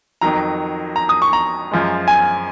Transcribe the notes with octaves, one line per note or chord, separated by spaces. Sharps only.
F2 D#3 F#3 A#5
A#5
D#6
C#6
A#5
F#2 F3 G#3
G#5